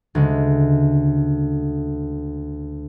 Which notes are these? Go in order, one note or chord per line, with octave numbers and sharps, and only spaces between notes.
D2 C#3 G#3